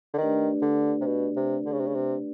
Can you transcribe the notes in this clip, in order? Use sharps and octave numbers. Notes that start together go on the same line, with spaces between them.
D3
D#3 A3 D4 G4 B4 D5
D3
C3
B2
C3
D3
C#3
C3
C#3
C3